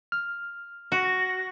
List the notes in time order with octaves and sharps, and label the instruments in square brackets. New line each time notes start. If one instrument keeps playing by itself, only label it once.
[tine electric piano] F6
[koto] F#4 [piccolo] A#6
[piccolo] A#6